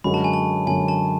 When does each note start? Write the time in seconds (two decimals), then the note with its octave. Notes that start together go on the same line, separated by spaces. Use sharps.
0.04 F#2 D3 G#3 C#4 F#4 B5
0.14 A5
0.24 G#5
0.33 A5
0.67 F#2 D3 G#3 C#4 F#4 G#5
0.88 A5